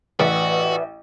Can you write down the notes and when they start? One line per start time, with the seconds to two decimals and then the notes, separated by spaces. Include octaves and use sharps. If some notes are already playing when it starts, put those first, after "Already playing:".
0.19 A1 F#4 B4 D5 E5